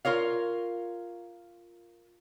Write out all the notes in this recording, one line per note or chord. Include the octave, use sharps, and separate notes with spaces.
F4 A#4 C#5 F5